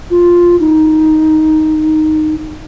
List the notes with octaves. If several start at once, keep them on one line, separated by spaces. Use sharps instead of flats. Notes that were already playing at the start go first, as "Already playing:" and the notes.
F4
D#4